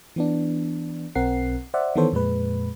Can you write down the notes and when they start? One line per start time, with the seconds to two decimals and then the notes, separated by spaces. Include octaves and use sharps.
0.16 E3 B3 D4
1.15 B1 C4 A#4 F#5 C7
1.74 C5 D5 E5 F#5
1.95 D#3 E3 B3 A4 C5 C#5
2.13 F2 A#2 G#3 B4